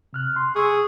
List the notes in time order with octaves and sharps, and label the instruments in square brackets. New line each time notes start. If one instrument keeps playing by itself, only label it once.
[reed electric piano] C3 F6 F#6
C6
[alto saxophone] G#4 [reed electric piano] C#6 E6